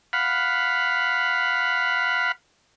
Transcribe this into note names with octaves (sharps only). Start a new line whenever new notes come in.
F5 F#5 B5